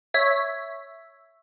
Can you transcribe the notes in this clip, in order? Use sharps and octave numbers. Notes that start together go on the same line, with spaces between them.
C#5 E5